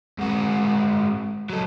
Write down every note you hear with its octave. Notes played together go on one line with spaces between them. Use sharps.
G#2 F#4
F#3 A4